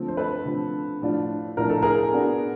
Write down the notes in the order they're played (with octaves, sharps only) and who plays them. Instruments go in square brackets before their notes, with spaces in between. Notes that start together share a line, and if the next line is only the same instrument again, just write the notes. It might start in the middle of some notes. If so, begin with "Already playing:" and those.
Already playing: [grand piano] D3 F3 A3 C4
[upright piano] C5
A4 B4
[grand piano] D3 F3 A3 C4
A2 F3 A3 D4 F4
[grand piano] A2 F3 A3 D4 F4 [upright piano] A#4
[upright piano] A4
G#4 A#4
[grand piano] B3 D4 F#4